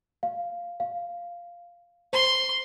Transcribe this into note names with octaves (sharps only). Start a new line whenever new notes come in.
F5
F5
C5 C6